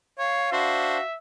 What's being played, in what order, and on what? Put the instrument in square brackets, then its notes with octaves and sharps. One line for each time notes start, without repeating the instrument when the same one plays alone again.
[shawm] C#5 [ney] F5
[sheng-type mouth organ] D4 C5 C6 [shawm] F#4 [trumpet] E5